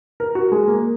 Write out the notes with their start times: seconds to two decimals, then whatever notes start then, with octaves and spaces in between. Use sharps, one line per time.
0.20 A#4
0.35 F#4
0.52 G#3
0.68 A#3